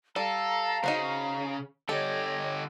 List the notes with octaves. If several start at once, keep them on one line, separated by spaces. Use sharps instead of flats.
G3 A4 F5 A#5
C#3 D#4 F#4 C5
D3 G4 A4 C#5 D#5